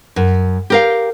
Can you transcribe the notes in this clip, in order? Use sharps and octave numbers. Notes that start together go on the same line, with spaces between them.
F#2
G4 A#4 F5